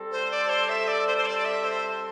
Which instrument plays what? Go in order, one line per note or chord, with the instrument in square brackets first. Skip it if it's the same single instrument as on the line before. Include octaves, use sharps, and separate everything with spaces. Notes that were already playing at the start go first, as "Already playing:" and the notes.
Already playing: [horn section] G3 C4 A4
[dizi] C5
D5
C5
E5
D5
C5
C5
D5
E5
C5